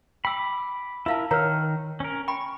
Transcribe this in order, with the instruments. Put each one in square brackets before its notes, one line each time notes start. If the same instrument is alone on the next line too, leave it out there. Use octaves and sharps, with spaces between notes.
[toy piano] G5 E6 [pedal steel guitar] B5 D6
[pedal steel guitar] E4 A#4 [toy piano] E5 F5 A5
[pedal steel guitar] D#3 F6 [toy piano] A#4 C#5 A#5
[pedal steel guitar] C#4 A#4
[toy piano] G5 B5 [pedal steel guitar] C#6